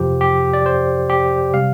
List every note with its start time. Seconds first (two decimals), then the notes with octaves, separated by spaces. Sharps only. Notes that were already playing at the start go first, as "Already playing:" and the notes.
Already playing: F2 C3 F3 G4
0.21 G4
0.53 D5
0.66 C5
1.09 G4
1.53 C3 G3 F5